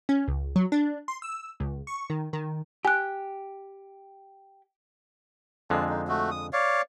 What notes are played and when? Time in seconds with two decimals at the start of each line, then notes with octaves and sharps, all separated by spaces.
0.09 C#4
0.28 C#2
0.56 F#3
0.72 D4
1.08 C6
1.22 E6
1.60 C#2
1.87 C#6
2.10 D#3
2.33 D#3
2.85 G4 G#5 F#6
5.70 F2 D3 G#3 A5
5.89 D#4
6.08 A3 F#4
6.31 D#6
6.53 C#5 D5 F5